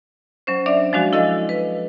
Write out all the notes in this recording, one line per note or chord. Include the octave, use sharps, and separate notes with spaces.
F#3 C#4 C5
D4 D5 E5
F3 G#3 D4 F#4
E4 A4 D#5 F5
B4